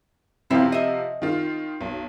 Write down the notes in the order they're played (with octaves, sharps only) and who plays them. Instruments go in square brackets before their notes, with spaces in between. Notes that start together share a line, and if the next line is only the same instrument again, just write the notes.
[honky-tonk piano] C3 F3 F5 [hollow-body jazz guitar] C4 E4 G4
[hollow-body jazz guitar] D#5 E5
[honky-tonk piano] D#3 F4
B1